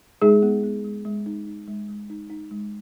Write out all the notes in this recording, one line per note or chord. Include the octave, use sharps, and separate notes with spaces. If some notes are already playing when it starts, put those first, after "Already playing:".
G#3 D#4 G#4
B3
B3
G#3
G#3
D#4
D#4
G#3
G#3
D#4
D#4
G#3